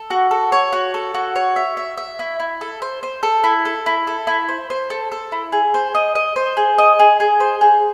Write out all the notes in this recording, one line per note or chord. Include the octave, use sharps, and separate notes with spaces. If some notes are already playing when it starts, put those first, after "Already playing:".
Already playing: A4
F#4
A4
C#5
F#4
A4
F#4
C#5
E5
E5
E5
E4
E4
A4
C5
C5
A4
E4
A4
E4
A4
E4
C5
C5
A4
A4
E4
G#4
C5
D#5
D#5
C5
G#4
D#5
G#4
G#4
C5
G#4